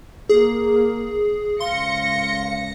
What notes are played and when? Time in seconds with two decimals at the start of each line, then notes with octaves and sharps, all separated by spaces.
0.29 A#3 G#4
1.60 C#2 F5 C6 A#6 C#7